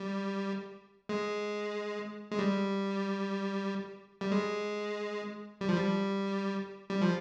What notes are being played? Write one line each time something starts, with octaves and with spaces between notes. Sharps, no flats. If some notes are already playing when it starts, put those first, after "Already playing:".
Already playing: G3
G#3
G#3
G3
G3
G#3
G3
F3
G3
G3
F3